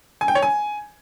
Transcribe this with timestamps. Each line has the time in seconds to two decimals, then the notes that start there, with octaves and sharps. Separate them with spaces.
0.21 G#5
0.28 G5
0.35 C#5
0.42 G#5